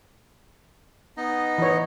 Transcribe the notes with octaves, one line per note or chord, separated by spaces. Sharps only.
B3 D#4 D#5
E3 C#5